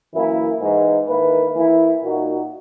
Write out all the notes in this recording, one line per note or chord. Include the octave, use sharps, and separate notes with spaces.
F#2 E3 A#3 E4
G#2 E3 G#3
D#3 A#3 E4 B4
E3 A#3 E4
A#2 A#3 D#4 F#4